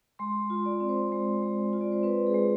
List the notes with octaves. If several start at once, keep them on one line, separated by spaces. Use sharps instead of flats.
G#3 C6
F4
D5
C4
C5
G#3
G#3
F4
D5
C5
C4 B4
G#4
G#3